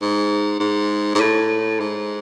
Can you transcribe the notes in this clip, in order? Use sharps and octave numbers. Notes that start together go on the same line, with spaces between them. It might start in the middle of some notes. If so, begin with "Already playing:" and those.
G#2
G#2
G#2
A2
G#2